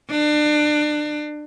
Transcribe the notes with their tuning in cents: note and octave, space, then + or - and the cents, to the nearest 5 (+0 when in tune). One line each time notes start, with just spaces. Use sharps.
D4 +30